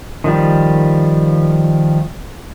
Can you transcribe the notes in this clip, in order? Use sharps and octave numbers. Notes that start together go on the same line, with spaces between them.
D#3 F3 G3